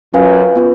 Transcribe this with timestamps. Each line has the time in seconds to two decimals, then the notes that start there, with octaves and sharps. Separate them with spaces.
0.14 F#2 C#4 F4 B4 F5 G#5
0.55 B3 F4 B4